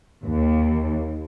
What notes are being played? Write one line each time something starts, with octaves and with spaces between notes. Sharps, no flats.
D#2